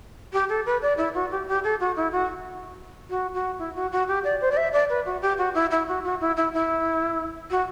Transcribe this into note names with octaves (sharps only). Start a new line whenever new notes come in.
G4
A4
B4
D5
E4
F#4
G4
G4
A4
F#4
E4
F#4
F#4
F#4
E4
F#4
F#4
G4
D5
C5
D5
E5
D5
B4
F#4
G4
F#4
E4
E4
F#4
F#4
E4
E4
E4
F#4